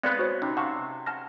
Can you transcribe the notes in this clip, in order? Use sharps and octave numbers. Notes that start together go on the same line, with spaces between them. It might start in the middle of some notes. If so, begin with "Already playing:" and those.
G#3 B3 C4 B4 D5 F5 C#7
F#4 C5 C#5
C3 C#4 D#4 B5
C3 F5 F#5 A5 C#6
F#5 G#5 A5 C6 F6 A#6